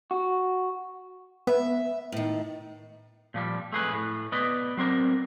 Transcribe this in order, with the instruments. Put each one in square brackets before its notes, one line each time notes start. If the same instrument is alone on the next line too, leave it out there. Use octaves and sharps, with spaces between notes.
[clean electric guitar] F#4
[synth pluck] B3 [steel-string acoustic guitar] E5
[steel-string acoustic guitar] A2 D#3
[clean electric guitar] A#2 F3 G3
A3 G#4 B4
A2
B3 B4 D5 D#5
F#3 C4 D4 A#4